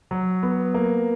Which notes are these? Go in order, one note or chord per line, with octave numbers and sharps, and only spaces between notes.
F#3
B3
A#3